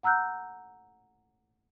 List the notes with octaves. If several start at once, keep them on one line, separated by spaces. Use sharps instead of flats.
F#5 A#5 E6 F#6 G6